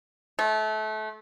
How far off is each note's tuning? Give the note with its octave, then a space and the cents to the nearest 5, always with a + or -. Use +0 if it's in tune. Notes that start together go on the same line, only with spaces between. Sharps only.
A3 -25